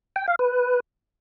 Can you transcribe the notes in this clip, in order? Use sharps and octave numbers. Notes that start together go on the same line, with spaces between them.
G5
F5
B4